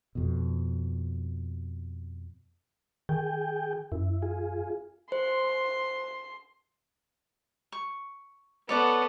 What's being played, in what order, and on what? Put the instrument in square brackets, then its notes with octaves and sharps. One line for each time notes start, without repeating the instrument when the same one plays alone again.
[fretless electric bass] F2 B2
[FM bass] D#3 [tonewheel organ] G#4 G5
[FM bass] F#2 [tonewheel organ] E4
[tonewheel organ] F4 G#4
[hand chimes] C5 [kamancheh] C6
[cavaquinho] C#6
[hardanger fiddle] B3 A4 [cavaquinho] C#5 D5 F#5